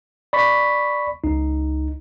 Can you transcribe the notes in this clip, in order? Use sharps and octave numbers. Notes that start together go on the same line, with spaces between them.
D5 B5 C#6 B6
C#2 D#4